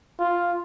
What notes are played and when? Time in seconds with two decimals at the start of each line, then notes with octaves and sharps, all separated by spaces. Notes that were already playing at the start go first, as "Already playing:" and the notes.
0.19 F4